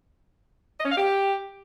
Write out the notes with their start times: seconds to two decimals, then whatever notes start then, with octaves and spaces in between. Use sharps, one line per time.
0.79 D#5
0.85 C#4
0.91 F5
0.97 G4